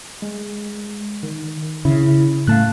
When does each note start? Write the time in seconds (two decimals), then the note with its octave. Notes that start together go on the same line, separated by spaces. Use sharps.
0.22 G#3
1.23 D#3
1.85 C#3 E4
2.47 A2 A3 F5 A5 F#6